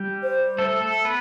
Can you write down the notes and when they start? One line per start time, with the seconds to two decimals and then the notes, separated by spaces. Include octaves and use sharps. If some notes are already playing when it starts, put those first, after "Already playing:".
Already playing: G3 G4
0.22 C5
0.58 A3 A4
0.81 A3 A4
1.05 B3 B4